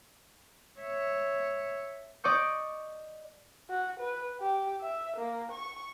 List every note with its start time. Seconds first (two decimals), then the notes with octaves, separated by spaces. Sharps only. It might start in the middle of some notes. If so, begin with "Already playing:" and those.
0.80 C#5 E5
2.24 D5 D#5 C#6 G6
3.70 F#4
3.99 B4
4.41 G4
4.81 E5
5.16 A#3
5.51 C#6